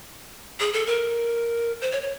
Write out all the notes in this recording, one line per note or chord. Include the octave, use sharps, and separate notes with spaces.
G#4
A4
A#4
C5
C#5
C#5